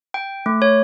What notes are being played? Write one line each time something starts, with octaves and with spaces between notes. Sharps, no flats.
G5
A3
C#5